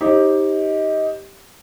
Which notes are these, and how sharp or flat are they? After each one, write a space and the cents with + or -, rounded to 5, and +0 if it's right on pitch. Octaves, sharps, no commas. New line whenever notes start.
D#4 +20 G4 +0 C5 +45